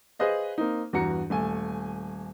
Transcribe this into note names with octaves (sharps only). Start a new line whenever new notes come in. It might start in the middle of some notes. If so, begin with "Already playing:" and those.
G#4 B4 C5 D#5 F5
A#3 C4 D#4
E2 G2 F#4 A#5 C#7
D#1 A3 G#5